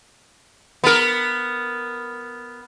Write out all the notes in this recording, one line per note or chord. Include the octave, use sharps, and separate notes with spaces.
B3 A#4